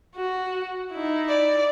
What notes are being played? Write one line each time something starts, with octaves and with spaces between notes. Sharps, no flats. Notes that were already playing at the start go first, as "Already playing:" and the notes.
F#4
D#4 E4
D5